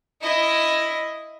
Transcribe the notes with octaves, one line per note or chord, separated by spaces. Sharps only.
E4 D#5